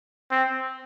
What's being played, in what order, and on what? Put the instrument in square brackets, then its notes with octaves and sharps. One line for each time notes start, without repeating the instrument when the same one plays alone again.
[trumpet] C4